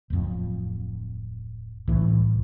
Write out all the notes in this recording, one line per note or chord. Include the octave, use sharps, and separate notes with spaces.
D1 F2
C2 A2 E3